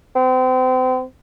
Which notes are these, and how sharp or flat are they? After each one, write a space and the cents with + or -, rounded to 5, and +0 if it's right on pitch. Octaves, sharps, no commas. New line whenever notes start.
C4 -35